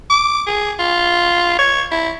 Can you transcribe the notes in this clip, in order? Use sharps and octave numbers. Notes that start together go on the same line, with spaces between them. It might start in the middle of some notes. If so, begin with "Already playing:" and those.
D6
G#4
F4
C#5
E4